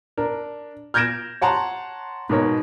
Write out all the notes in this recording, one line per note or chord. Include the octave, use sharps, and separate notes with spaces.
D4 A#4
F6 G6 G#6 A#6 D7 E7
C#5 F#5 A5 A#5 C6
G#2 B2 A#4 C#5